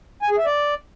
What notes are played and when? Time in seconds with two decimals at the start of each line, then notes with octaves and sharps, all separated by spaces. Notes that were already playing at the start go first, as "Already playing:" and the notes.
0.22 G#5
0.30 G#4
0.38 E5
0.46 D5